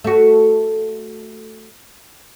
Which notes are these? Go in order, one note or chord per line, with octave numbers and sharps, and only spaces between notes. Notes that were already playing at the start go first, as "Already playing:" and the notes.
A3 F#4